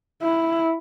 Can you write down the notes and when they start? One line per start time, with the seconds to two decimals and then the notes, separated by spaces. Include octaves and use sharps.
0.22 E4